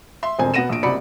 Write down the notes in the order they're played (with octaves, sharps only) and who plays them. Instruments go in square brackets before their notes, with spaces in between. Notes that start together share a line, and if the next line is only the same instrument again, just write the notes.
[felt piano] E5 C6
E1 F2 C5 G#5
B2 B3 F#5 A#6 D#7 E7
A#1 D7
F#1 C2 F#4 D5 B5 C#7